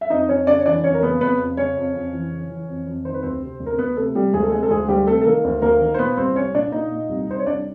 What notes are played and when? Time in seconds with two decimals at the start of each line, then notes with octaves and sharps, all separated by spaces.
0.01 E5
0.10 F2 D#4 D#5
0.29 F2 C#4 C#5
0.47 C#3 D4 D5
0.59 C#5
0.66 E3 D4 D5
0.84 F2 C#4 C#5
0.94 A#4
1.02 C#3 B3 B4
1.21 F2 B3 B4
1.40 F2
1.57 C#3 C#4 C#5
1.77 F2
1.94 F2
2.13 E3
2.31 C#3
2.50 E3
2.68 F2
2.86 F2
3.05 D#3 C5
3.14 B4
3.23 D2 C4 C5
3.42 C3
3.60 D2
3.66 A#4
3.78 D2 B3 B4
3.97 C3 A3 A4
4.15 C3 G3 G4
4.33 D2 G#3 G#4
4.44 A4
4.52 C3 G#3 G#4
4.63 A4
4.70 D2 G#3 G#4
4.88 D2 G3 G4
5.07 C3 A3 A4
5.21 A4
5.25 D#3 A#3 A#4
5.44 D2
5.62 D2 A#3 A#4
5.81 D#3
5.94 C5
5.99 A#2 B3 B4
6.17 C2 C4 C5
6.35 C2 C#4 C#5
6.54 A#2 D4 D5
6.72 A#2 D#4 D#5
6.91 A#2
7.09 C2
7.28 C2 C5
7.39 C#5
7.46 C2 D4 D5